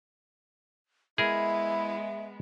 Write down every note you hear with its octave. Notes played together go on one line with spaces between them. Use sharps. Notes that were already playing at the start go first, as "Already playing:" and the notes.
G#3 B3 E4 G#4 A#4 E5